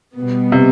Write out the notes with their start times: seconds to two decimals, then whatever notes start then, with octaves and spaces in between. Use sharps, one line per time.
0.16 B2 G3 B3
0.52 C3